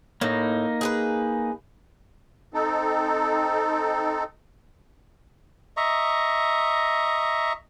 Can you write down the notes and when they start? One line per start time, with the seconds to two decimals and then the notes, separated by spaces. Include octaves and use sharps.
0.21 A2 A#3 D#4
0.81 G#4 A#4 B4
2.54 C4 D#4 A4
5.77 D#5 E5 A#5 C#6